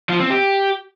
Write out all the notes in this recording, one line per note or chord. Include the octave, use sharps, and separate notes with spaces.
F3
C4
G4